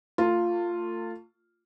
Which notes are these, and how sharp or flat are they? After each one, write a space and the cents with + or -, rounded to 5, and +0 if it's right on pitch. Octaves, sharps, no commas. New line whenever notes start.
A3 +35 F4 +0